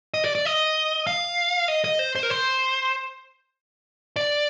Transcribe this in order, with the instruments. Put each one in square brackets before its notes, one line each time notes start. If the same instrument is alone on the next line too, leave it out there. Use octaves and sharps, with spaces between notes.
[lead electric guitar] D#5
D5
D5
D#5
F5
D#5
D#5
C5
C5
A#4
C5
D5